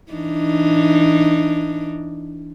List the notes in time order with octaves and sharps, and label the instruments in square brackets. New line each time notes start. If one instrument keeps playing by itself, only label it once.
[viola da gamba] E3 D4 D#4